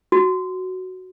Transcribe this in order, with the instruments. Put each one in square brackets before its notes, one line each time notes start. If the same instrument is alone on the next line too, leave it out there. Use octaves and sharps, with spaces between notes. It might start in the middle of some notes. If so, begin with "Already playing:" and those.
[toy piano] F#4